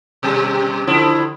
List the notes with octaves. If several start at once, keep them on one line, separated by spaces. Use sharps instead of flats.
B2 G3
D3 F3 E4